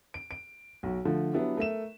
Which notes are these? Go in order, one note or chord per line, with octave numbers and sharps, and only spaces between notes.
D7
D7
B1 F#4
D3 F3 A3
F#3 B3 D4 E4 G4
A3 A#4 E5 E7